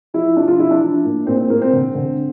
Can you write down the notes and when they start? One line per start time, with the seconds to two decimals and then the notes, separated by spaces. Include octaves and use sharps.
0.14 F3 E4
0.37 F3 D4
0.48 F4
0.59 F3 E4
0.71 D4
0.81 F3
1.05 A#2
1.27 A#2 C4
1.38 C4
1.50 A#2 A#3
1.62 C4
1.73 D3
1.95 D3